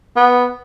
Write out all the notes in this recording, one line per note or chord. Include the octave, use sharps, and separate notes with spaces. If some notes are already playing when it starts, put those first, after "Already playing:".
B3